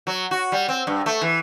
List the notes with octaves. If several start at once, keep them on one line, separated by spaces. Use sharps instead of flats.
F#3
F#4
G3
C4
G2
A3
E3